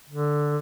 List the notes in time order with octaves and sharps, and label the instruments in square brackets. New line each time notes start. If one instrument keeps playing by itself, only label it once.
[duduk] D3